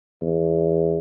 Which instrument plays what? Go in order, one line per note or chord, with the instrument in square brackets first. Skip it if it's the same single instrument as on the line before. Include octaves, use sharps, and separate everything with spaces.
[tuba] E2